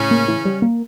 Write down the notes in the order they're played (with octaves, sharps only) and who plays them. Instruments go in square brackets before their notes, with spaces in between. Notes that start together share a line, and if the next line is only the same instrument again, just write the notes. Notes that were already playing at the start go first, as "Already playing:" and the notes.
Already playing: [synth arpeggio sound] A2 [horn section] C#3 C#4
[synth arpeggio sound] A#3
E3
G3
A#3